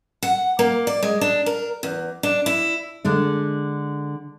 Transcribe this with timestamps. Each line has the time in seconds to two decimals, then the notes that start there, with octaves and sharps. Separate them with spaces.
0.23 F#5
0.59 A#3
0.87 D5
1.03 G#3
1.21 D4
1.46 A#4
1.83 E2
2.23 D4
2.46 E4
3.04 D3 G#3 D4